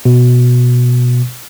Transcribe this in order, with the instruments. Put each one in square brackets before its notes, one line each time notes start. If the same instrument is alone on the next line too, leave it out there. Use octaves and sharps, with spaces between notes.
[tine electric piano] B2